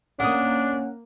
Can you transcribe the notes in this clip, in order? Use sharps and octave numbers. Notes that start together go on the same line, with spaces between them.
A#3 C#4 D4 F#5 D#6